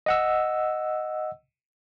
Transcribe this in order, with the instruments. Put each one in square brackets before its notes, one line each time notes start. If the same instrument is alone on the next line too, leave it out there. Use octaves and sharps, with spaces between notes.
[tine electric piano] D#5 F#5 E6